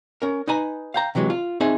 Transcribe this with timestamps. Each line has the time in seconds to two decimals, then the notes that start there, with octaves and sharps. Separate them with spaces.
0.22 C#4 A#4
0.47 D#4 B4 G#5 A#5
0.94 F5 G5 A#5
1.15 C3 E3 F#3 G#3
1.30 F4
1.60 C4 D#4 G#4 E5 G#5